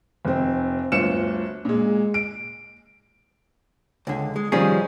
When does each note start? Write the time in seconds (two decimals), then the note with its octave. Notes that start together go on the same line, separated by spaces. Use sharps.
0.25 F1 C4
0.92 G1 D2 F4 C#7 E7
1.65 A#2 G#3
2.14 D7
4.07 C#2 D3
4.36 G#3
4.52 D#3 F3 G3 C#4 D#4 G#4